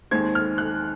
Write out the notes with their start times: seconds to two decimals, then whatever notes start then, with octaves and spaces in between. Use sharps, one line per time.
0.11 D#2 D#3 G#3 C4 G#6
0.35 F6
0.58 F#6